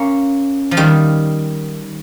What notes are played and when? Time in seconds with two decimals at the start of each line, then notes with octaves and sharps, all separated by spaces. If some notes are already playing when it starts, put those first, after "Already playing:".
Already playing: A#3 C#4
0.71 F3
0.77 D#3 G3